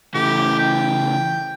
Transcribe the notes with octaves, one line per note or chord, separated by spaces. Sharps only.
C#3 E3 A3 G4
G5